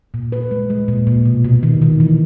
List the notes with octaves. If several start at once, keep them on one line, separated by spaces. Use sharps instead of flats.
A#2
B4
G#3
G#3
A#2
A#2
B2
B2
D#3
D#3
E3